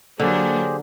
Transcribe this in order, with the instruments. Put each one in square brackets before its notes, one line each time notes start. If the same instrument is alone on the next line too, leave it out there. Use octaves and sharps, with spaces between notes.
[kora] D3 [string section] F#3 A#3 D4 [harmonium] G4 G#4 C5